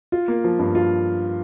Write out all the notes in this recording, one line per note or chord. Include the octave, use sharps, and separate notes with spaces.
F4
A#3
F3
G2
F4